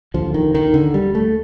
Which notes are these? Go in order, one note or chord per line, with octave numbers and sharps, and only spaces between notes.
D#2 D3 F3
D#3
D#3
D3
G3
A3